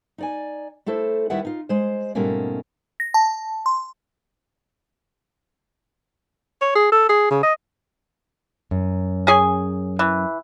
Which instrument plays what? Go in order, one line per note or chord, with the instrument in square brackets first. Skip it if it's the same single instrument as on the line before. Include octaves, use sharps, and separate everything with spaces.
[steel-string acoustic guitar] D#4 D5 G#5
A3 E4 A4 C5
D#2 D#3 G3 E4 B4 F#5
D#4 F4
G#3 C5
G#2 B2 G3 A3 A#3 C#4
[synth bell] A#6
A5
C6
[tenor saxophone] C#5
G#4
A4
G#4
C#3
D#5
[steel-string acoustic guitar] F#2
[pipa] C#4 G#4 G#5
E3